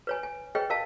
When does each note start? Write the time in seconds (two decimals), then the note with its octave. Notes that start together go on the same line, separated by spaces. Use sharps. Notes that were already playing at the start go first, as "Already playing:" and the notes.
0.07 B4 C#5 G#5
0.23 G#5
0.55 G#4 B4 C#5 D#5 G5
0.70 A#4 D#5 F5 A5